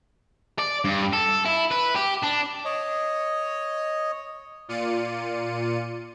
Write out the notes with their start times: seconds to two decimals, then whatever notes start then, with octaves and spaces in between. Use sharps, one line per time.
0.59 D5
0.85 G2
1.13 A4
1.46 E4
1.71 B4
1.96 G4
2.24 D4
2.65 C#5 D#5
4.68 A#2 F4 D5 C#7 D#7